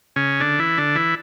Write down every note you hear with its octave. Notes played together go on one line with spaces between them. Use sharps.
C#3 C#4
D3 D4
E3 E4
D3 D4
E3 E4